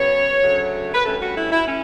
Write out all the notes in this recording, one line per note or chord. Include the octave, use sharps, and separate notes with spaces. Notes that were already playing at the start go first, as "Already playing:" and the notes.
Already playing: C#3 F#3 B3 C#5
D2 C#3 F#3 A3
B4
G2 E3 A3 C#4 A4
F#4
E4
E4
A2 C#4